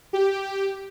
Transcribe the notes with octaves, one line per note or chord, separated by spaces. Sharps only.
G4